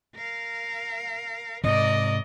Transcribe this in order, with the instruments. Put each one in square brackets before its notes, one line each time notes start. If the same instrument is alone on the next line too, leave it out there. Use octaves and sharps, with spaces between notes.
[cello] A#4 F5
[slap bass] G#2 C3 [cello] A#4 D5 [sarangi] D#5